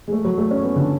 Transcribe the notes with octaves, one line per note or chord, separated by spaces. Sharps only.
G#3
A3
F#3
A3
C#4
B3
D3